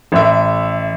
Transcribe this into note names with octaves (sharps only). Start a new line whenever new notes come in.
A1 E5